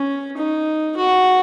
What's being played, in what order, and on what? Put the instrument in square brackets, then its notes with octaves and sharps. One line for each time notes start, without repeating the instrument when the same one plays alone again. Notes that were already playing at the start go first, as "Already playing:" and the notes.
Already playing: [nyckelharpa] C#4
D#4
F#4